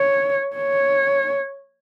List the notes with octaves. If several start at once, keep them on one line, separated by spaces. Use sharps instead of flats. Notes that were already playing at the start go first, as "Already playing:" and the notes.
Already playing: C#5
C#5